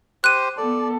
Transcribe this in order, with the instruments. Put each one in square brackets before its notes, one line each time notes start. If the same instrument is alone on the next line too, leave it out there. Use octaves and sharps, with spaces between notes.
[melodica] G4 C5 [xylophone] F#6 D#7
[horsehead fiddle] B3 A4 [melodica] D5